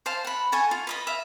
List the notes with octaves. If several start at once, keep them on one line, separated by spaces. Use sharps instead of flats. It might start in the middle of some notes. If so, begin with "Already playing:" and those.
C5 F5 A5
F#5 B5
A4 F#5 G#5 C#6
F4
B4 D#5 B5
E5 F5